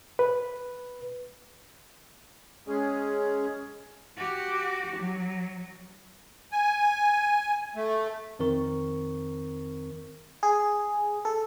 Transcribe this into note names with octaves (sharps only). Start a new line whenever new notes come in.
B4
G#3 C#4 G#4
F#4 G4
F#3
G#5
A3
F2 D#3 C4 A#4 C#6
G#4
A4